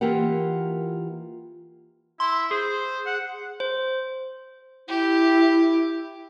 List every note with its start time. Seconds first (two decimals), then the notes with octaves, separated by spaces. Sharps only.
0.01 E3 A#3 F4 G4 A#4 F#5
2.20 E4 C6
2.51 G#4 C5
3.06 F#5
3.60 C5
4.88 E4 G4